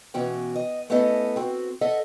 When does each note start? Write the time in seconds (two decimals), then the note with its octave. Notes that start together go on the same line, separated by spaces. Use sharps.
0.14 B2 E3 C#4 F#4 G5
0.56 D#5
0.90 A3 B3 C#4 E4 A4 D#5
1.36 C4 F#4
1.81 A4 D#5 E5 F#5